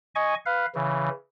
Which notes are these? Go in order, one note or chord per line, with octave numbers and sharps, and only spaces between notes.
D#5 G#5 C#6
B4 F5
C#3 E3